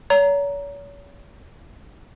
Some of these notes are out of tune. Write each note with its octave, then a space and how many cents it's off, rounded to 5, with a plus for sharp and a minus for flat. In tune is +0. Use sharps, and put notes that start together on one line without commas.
C#5 +40 A#5 +0